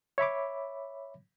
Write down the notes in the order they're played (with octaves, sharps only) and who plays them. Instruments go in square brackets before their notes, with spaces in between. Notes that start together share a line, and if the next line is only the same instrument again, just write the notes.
[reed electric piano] C#5 E5 B5 D6